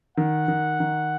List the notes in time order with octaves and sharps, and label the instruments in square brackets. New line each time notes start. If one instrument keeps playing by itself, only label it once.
[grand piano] D#3 [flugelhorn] F#5
[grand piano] D#3
D#3